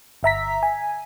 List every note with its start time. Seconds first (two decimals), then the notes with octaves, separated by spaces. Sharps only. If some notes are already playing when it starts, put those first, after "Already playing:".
0.23 G1 E5 A#5 B6
0.63 G#5